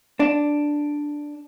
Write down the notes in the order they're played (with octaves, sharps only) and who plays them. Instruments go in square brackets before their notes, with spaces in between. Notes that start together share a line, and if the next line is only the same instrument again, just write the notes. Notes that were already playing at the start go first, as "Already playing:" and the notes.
[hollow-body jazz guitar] D4